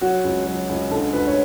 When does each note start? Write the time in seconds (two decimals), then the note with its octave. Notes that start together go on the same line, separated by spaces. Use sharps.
0.01 F#3 F#4
0.24 C#2
0.46 F#3
0.69 C#2
0.91 D3 A4
1.13 D2 B4
1.27 C#5